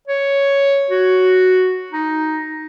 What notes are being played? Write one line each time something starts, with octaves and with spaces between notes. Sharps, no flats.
C#5
F#4
D#4